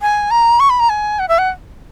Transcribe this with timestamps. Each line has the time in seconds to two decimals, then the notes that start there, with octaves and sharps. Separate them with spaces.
0.02 G#5
0.31 A#5
0.60 C#6
0.70 B5
0.80 A#5
0.89 G#5
1.19 F#5
1.28 E5
1.38 F#5